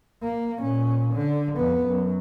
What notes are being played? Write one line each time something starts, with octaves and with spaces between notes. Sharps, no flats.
A#3
A#2 C#4
D3
F2 B3
F#2